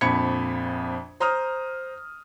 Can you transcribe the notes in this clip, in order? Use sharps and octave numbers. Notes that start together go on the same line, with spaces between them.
A#1 F2 B5 G#6 C#7
C5 A#5 D#6 F6